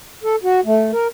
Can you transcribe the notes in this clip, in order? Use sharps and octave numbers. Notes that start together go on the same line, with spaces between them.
A4
F#4
A3
A#4